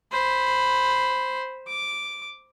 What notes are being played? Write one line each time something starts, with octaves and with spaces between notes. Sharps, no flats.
C5 B5
D6